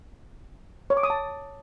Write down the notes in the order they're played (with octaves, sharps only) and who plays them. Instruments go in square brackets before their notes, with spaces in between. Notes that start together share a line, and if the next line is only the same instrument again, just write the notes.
[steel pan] C#5
D6
D#6
A5